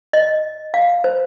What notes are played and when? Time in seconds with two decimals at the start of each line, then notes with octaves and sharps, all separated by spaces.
0.13 D#5
0.74 F5
1.04 C5